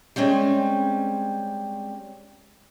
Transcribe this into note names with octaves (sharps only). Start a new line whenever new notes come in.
G3 G#3 C4 C#4